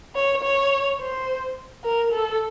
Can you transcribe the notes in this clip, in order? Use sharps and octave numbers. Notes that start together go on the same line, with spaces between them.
C#5
C#5
C5
A#4
A4